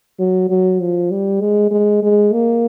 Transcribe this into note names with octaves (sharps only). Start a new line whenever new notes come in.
F#3
F#3
F3
G3
G#3
G#3
G#3
A#3